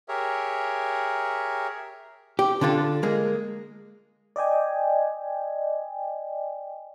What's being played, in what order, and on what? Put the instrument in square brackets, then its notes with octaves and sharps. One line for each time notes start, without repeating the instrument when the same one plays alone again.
[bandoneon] G4 G#4 A#4 C#5 E5
[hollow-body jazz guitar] G4
D3 D4 F4 G#4 A4
G#3 A#3
[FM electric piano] D5 D#5 G5 G#5